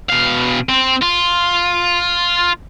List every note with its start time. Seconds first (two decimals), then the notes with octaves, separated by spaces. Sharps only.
0.09 B2 F5
0.69 C4
1.02 F4